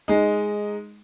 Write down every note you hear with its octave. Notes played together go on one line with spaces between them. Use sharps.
G#3 D#4